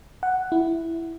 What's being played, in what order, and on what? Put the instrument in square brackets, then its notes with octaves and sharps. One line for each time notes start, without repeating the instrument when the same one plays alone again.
[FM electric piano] F#5
E4